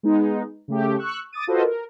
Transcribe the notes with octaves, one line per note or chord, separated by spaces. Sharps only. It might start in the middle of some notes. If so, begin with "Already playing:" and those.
G#3 B3 D#4
C#3 A3 G4
C#6 E6 F#6
D6 D#6 A6 D#7
F4 F#4 A4 B4 C5 D#5
A#4